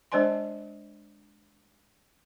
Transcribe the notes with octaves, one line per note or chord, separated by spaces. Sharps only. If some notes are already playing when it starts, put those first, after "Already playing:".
G#3 D4 C5 D5 G#5 C6